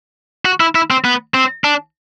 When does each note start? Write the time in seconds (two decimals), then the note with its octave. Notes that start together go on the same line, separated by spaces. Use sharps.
0.45 F#4
0.60 E4
0.75 E4
0.90 C4
1.05 B3
1.34 C4
1.64 D4